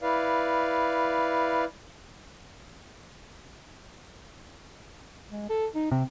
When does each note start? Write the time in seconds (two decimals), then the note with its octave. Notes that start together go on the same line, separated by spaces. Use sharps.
0.02 E4 B4 D5 F5
5.31 G#3
5.49 A4
5.75 D#4
5.92 C3 C4